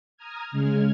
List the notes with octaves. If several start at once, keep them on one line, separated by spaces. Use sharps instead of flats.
A#5 D#6 F6 G#6
C#3 G#3 F6 G#6